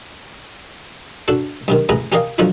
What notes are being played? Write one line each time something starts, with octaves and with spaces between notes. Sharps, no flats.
D4 F#4 A4
G2 C3 D#3
A1 G#4 B4 A#5
C#4 G4 A#4 D5 D#5 F5
D3 F3 F#3 D#4 F4 F#4